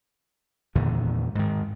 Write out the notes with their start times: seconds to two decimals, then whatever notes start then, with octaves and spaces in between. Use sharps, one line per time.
0.75 E2 A#2 D3 D#3
1.35 G#2 D#3